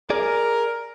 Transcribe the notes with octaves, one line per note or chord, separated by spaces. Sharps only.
G#4 A#4 D5